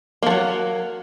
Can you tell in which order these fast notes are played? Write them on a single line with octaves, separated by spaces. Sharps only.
A#3 F3 F#3